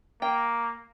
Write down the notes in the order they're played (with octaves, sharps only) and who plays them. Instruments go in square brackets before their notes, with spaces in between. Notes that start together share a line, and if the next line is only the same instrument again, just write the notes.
[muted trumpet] A#3 [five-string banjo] G5